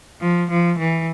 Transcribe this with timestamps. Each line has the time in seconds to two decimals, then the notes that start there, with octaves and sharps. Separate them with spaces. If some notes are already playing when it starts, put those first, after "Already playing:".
0.21 F3
0.50 F3
0.78 E3